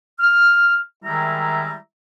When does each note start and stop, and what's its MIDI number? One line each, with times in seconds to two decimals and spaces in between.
0.20 0.77 89
1.05 1.74 51
1.05 1.74 55
1.05 1.74 56
1.05 1.74 64
1.05 1.74 76
1.05 1.74 82